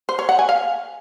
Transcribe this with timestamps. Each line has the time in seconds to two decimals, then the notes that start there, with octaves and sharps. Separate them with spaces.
0.09 C5
0.19 C#5
0.29 F#5
0.39 G#5
0.49 F5